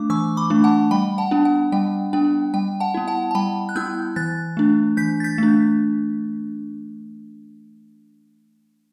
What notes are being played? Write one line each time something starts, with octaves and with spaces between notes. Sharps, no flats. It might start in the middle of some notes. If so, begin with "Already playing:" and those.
Already playing: A3 D4 D6
E3 C#6 E6
B5 D6
A3 D4
F#5 A5
G3 G5 B5
F#5 A5
B3 D4
F#5
G3 G5
B3 D4 G5
G3 G5
F#5 A5
B3 E4
F#5 A5
A5
G3 G5 B5
F#6
B3 E4 E6 G6
E3 F#6 A6
A3 D4
E3 G6 B6
A6
G6 B6
A3 D4